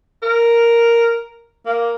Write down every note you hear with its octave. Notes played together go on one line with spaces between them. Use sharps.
A#4
A#3